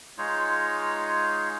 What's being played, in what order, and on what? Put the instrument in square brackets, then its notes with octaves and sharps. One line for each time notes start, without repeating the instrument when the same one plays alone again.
[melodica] G#3 D#4 F4 C#5